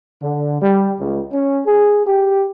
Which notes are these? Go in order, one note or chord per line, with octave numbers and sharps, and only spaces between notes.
D3
G3
C#2
C#4
G#4
G4